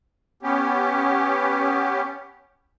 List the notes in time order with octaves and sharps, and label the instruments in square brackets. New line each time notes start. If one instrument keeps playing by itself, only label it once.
[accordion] B3 C#4 G4